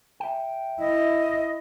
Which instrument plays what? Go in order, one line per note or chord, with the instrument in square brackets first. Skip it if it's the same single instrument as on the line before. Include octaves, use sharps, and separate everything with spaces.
[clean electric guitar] E5 G5
[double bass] E4 [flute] D#5